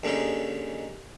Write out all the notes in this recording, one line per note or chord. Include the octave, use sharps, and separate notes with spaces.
D#2 D3 G#3 C#4 D#4